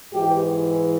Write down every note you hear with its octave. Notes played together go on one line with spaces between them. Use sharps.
G#2 E3 G4